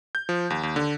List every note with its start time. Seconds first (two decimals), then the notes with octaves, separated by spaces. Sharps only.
0.15 G6
0.29 F3
0.50 D#2
0.63 D#2
0.76 D3